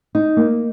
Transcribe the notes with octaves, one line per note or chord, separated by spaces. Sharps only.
D#4
A#3